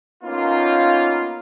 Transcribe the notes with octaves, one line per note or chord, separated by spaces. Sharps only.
A#3 B3 C#4 D#4 F4